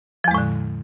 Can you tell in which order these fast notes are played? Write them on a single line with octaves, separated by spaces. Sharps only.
F3 E2 G#3 A2 D3